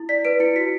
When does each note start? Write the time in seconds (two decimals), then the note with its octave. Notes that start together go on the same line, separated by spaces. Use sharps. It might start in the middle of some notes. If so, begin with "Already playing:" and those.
Already playing: E4
0.09 D5 B6
0.25 B4 D7
0.40 E4 C#7
0.56 F#4 B6